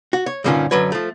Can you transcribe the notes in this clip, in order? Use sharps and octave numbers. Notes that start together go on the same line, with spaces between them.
F#4
C#5
G2 A#2 D3 D#3 C#4 F4
F#2 D3 F#3 B4 C#5
F3 A3